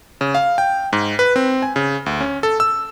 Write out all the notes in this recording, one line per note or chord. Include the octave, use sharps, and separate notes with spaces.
C#3
F5
G5
G#2
B4
C4
G#5
C#3
D2
C#4
A4
E6